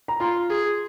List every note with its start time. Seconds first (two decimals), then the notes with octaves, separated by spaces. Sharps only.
0.08 A#5
0.20 F4 C6
0.50 G#4